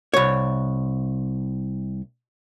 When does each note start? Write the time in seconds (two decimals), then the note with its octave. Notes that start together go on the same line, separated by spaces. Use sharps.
0.14 C2 C#5